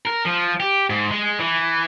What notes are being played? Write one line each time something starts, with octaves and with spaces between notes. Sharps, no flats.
A#4
F3
G4
G#2
G#3
E3